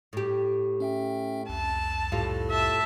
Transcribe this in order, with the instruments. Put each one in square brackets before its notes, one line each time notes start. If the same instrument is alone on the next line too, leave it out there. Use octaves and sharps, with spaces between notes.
[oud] A2 G4
[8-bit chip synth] C#4 E5 G5
[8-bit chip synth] C2 F2 [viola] A5
[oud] A2 G3 F4
[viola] E5 A5